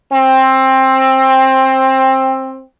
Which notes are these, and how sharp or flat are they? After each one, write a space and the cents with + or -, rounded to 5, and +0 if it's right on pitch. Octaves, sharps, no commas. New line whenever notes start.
C4 +20